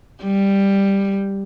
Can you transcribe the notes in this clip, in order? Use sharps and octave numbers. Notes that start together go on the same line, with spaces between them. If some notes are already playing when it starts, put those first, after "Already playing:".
G3